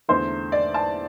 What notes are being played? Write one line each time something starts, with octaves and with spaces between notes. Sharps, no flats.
E2 D3 A3 C5
D5
A5